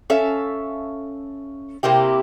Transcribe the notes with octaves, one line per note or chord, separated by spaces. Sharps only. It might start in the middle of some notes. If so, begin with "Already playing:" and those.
C#4 A4 E5 F5
C3 A#3 E4 G4